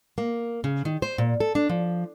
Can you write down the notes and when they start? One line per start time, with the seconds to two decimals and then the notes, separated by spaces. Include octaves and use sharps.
0.18 A#3
0.64 C#3
0.85 D#3
1.02 C5
1.18 A#2
1.40 A4
1.55 D4
1.69 F3